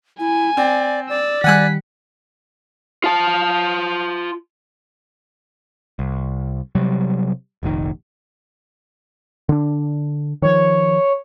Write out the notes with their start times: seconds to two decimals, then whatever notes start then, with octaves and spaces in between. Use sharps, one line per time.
0.20 E4 G#5
0.57 C4 D5
1.09 D5 E6
1.44 D#3 G3 F#5 G#5 F#6 B6
3.04 F4 A5
5.99 C2
6.75 C3 F#3 G3
7.63 F1 A#1 G#2 D#3
9.49 D3 D4
10.42 D#3 F3 C#5